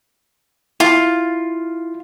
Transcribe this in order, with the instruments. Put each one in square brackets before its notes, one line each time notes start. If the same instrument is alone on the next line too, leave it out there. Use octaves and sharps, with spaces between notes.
[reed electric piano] E4 [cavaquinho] F4